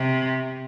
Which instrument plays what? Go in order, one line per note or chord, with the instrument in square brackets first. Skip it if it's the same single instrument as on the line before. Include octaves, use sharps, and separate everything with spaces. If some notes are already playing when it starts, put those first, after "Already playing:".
Already playing: [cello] C3